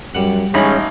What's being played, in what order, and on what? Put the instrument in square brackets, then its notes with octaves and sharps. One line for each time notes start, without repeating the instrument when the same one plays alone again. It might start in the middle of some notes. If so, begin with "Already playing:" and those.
[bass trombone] F#2 [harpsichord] G3 F#5
[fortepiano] A1 D#4 B5 [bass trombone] G#3 [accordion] C#4